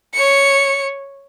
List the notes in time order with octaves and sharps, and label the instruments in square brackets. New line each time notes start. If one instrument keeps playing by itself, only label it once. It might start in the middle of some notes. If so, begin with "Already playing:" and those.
[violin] C#5 C#7